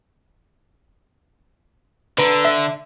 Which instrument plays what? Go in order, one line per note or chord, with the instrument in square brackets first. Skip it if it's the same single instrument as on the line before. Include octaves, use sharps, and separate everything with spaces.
[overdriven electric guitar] D3 [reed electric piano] B4 A#5
[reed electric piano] E5